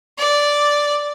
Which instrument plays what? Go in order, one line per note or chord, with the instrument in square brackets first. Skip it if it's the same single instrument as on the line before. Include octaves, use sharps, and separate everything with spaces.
[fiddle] D5